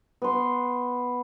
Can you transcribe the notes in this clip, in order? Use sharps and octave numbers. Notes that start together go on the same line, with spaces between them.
B3 C6